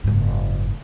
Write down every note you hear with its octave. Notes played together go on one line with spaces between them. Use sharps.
F#1 G#2